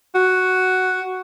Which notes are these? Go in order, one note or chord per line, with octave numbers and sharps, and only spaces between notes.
F#4